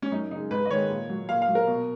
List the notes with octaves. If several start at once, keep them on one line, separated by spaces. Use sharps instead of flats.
C#4
F#2 D#4
C#3 G#3 D#4
G#2 B4
D#5
D#3 G#3 C#5
A#2
F#3
A#2 F5
F5
F#3
A#4
B2